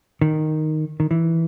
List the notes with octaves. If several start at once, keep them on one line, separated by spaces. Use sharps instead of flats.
D#3
D#3
E3